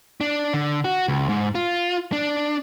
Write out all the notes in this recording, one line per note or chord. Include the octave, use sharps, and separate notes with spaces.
D4
D3
F#4
C#2
G#2
F4
D4